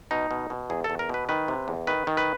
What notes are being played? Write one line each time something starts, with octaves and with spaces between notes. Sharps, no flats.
B2 D#4
B2
B2
E2 G#4
A4
E2
A#4
B2 B4
D#3 B4
C3
E2
D#3 B4
D#3
B4